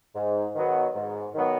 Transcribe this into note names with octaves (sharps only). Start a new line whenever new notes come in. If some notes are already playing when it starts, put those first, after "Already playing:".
G#2
D#3 F#3 B3
G#2
D#3 F#3 B3